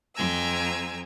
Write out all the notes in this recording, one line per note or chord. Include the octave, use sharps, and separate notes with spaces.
F2 C4 G#5 A#5 E6